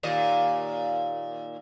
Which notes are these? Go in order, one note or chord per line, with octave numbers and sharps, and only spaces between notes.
D#2 A#2 D#5